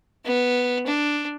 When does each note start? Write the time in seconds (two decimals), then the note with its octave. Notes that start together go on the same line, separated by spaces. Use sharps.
0.25 B3
0.87 D4